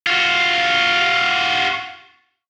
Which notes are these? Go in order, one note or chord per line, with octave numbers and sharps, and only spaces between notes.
F4 F#4